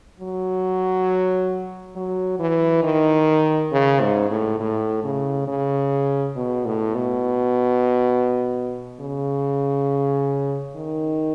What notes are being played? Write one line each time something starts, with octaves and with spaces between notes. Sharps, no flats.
F#3
F#3
E3
D#3
C#3
G#2
A2
A2
C#3
C#3
B2
A2
B2
C#3
D#3